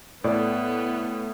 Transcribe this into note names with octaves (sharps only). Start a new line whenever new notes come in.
A2 B3 A4 D5